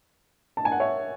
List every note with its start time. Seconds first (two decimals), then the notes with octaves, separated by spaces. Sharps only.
0.57 A5
0.65 G#5
0.72 F#5
0.80 C#5 E5